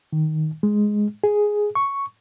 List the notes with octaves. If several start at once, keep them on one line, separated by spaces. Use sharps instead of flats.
D#3
G#3
G#4
C#6